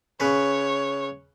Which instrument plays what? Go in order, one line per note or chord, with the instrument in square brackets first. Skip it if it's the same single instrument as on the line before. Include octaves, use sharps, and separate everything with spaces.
[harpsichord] C#3 B4 [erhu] C#5